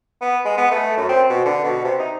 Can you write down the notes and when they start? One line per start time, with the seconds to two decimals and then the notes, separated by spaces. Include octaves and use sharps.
0.21 B3
0.45 G#3
0.57 B3
0.71 A3
0.97 F#2
1.09 C4
1.30 B2
1.45 D3
1.64 B2
1.85 C3
1.99 D#4